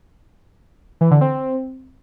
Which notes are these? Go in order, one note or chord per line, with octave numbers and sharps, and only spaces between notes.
E3
D3
C4